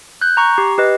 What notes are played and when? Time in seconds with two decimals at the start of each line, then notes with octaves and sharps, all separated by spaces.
0.21 F#6 G6
0.37 A#5 C#6
0.58 G4
0.78 G4 B4 D#5